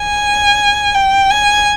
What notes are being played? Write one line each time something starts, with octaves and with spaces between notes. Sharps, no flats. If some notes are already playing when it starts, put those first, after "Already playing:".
Already playing: G#5
G5
G#5